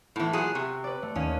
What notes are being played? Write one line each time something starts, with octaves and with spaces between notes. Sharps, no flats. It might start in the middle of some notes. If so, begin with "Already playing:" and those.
A2 E3 B3
A#2 F#3 G#4 F#6
C3 C#6
B4 D5
A3
D#2 C#4 D#7